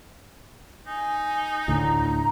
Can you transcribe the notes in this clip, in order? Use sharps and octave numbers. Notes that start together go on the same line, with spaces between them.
D#4 G#5
D2 A2 D3 A#5